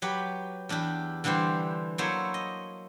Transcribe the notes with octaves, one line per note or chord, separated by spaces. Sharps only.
F#3 G4 B4 B5
E2 D4 E4 G4
D3 E3 G3 G4 C5
F#3 A#3 E4 A4 C5 C#5
D#5